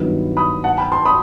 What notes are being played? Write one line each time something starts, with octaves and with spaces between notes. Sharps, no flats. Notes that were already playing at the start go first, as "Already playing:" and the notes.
Already playing: G2 D#3 F#3 B3 E4
B5 D#6
F#5 A5
G5 B5
A5 C6
B5 D#6